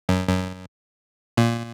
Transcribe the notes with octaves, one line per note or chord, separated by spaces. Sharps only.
F#2
F#2
A#2